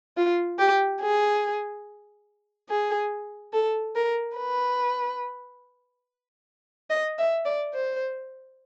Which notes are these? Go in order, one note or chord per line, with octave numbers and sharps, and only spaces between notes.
F4
G4
G#4
G#4
A4
A#4
B4
D#5
E5
D5
C5